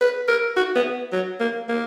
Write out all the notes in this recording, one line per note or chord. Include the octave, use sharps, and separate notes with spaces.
B4
A#4
F#4
B3
F#3
A#3
A#3